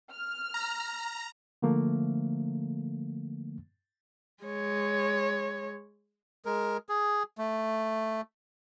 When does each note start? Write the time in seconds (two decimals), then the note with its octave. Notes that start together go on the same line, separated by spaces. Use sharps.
0.12 F6
0.54 A#5
1.62 D3 F3 A3 A#3
4.43 G#3 C#5
6.46 G#3 A#4
6.89 G#4
7.38 A3